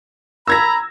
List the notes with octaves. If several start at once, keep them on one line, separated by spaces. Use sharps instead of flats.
A#5 B5 E6 G#6 A#6